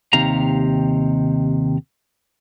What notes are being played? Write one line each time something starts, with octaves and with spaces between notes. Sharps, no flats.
D#2 C3 D#3 G4 F5 A#5